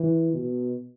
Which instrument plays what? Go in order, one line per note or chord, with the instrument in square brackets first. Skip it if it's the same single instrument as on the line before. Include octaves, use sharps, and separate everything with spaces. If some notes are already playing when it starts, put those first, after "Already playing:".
Already playing: [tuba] E3
B2